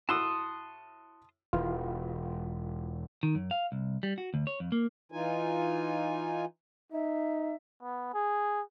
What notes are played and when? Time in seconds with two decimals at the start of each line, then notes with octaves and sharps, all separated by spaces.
0.09 A2 F#4 A5 C6 D#6 E6
1.53 E1 E3 F4
3.23 D#3
3.35 F#2
3.51 F5
3.72 C2
4.03 G3
4.18 F#4
4.34 D2
4.47 C#5
4.60 F2
4.72 A#3
5.12 E3 D#4 F4 G#5
6.92 D#4 E5
7.82 B3
8.14 G#4